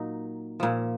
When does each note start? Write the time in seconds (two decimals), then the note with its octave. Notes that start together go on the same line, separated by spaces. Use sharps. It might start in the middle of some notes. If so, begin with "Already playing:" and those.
Already playing: A#2 F#3 D#4
0.60 A#2 F3